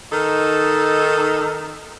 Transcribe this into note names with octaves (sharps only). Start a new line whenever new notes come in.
D#3 D#4 A4